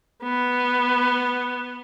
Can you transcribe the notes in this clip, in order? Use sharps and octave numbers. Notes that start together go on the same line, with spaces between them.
B3